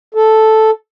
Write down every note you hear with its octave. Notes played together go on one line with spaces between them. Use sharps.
A4